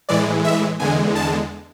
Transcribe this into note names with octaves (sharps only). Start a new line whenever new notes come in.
A2 E3 G#3 D5
E5
E2 D3 G#3 G#5
A5